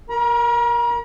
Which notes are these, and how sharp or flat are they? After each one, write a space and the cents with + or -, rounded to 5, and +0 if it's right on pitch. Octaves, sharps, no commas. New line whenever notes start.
A#4 +0 A#5 +45